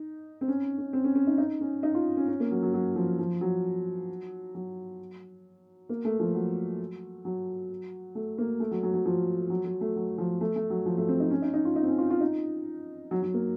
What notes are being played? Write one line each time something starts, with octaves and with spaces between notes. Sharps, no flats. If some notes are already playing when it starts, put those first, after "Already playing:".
Already playing: D#4
C4
C#4
C#4
C4
C#4
C#4
D#4
D#4
C#4
D#4
F4
C#4
C#4
A#3
F#3
F#3
F#3
F3
F3
F#3
F#3
A#3
A3
F3
F#3
F#3
A3
A#3
A3
F#3
F#3
F#3
F3
F#3
F#3
A3
F#3
F3
A3
A3
F#3
F3
A3
C4
D#4
C#4
D#4
D#4
F4
D#4
C4
C#4
F4
F4
D#4
F#3
F#3
A#3